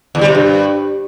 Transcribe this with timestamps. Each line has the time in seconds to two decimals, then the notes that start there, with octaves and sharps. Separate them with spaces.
0.15 E2
0.21 G3
0.28 C3
0.35 G2